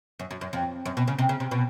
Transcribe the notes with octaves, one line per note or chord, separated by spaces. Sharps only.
F#2
F#2
F#2
F2
F#2
B2
C#3
C3
C#3
C3
B2